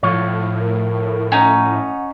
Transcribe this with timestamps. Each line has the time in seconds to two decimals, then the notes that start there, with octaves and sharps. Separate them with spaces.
0.03 A2 F3 C#5
0.61 A#4
1.32 C#4 D#4 F#5